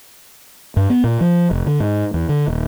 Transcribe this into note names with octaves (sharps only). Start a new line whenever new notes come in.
G2
B3
A#2
F3
F1
D3
G#2
E2
D3
D#1